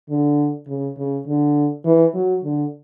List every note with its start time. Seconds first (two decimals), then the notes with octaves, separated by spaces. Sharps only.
0.10 D3
0.68 C#3
0.97 C#3
1.27 D3
1.84 E3
2.14 F#3
2.43 D3